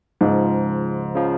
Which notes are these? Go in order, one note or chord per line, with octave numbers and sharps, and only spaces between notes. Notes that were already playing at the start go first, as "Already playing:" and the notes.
C#2 G#2 C#3 F3
C#3 F3